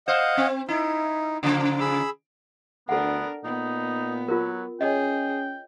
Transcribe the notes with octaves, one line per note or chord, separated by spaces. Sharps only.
C5 D#5 F5 F#5
C4
D#4 E4
C#3 F3 A#3
G#4 B5 E6
D2 B3 D4 A4 A#4 F#5
A#2 B3 D#4
F#3 F4 A#4
C#4 G#4 C#5 D#5 G5